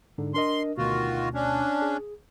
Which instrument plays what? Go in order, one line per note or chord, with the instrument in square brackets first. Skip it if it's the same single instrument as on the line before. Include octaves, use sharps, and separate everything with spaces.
[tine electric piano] G#2 D3 D#4
[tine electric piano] D4 A#4 D#5 [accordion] C6
[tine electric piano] D2 B2 [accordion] D#3 F4 F#4
[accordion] C#4 D4
[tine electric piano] G#4